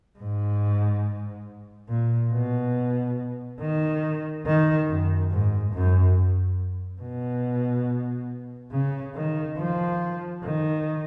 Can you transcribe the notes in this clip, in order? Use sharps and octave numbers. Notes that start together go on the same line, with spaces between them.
G#2
A#2
B2
D#3
D#3
F#2
G#2
F#2
B2
C#3
D#3
F3
D#3